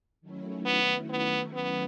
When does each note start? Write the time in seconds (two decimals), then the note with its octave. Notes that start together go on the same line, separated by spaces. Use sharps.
0.21 D#3 F#3 A3 C#4 E4
0.65 B3
1.10 B3
1.54 B3